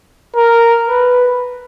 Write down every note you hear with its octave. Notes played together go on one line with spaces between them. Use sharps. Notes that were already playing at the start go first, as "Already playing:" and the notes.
A#4
B4